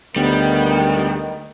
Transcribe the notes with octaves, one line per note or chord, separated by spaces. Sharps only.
D2 D#3 G3 B3